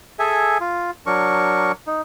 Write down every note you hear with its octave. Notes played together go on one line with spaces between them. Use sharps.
G#4 A4 E5 G#5
F4
F#3 D4 A#4 C#6
D#4